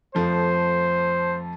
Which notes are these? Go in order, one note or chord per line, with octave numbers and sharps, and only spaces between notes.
F2 F3 A3 C5